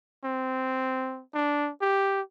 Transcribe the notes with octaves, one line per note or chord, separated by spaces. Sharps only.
C4
D4
G4